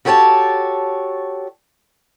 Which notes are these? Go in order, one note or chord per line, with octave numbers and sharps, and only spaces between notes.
F#4 G4 A4 C#5 G5 A5